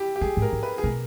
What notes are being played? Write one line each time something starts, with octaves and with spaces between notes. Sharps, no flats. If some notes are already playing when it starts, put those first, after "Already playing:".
Already playing: E4 G4
G4
G3 G#4
G#2
A#4
G#2
B4
G#4
B2 A#4